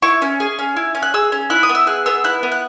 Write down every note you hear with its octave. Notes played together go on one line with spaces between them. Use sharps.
E4 C#6
C#4
G#4
C#4
E4
C#4
F#6
G#4 E6
C#4
E4 F#6
D#6
B3
E6
G#4 F#6
B3 E6
E4 F#6
B3
F#6